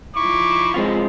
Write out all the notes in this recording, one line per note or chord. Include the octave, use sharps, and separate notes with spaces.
F3 D#4 E4 C#6 D6
G#3 C4 F4